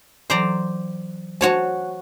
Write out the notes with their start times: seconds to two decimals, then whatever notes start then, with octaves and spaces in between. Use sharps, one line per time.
0.30 E3 F#3 C5 D5 A#5
1.41 F#4 C5 C#5 A5